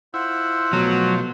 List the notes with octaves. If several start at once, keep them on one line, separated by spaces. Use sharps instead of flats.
E4 F4 C5 F#5
B2 F3 F#3 A3